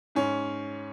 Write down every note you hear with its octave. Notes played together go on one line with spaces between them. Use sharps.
G#2 C#4